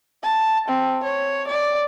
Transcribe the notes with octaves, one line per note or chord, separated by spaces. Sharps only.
A5
C4
C#5
D5